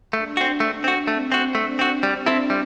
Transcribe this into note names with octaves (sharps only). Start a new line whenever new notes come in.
A3 D4
C4 F#4
A3
C4 F#4
A3 C4
C4 F#4
A3 D4
C4 F#4
G3
C4 E4 A4 E5
G3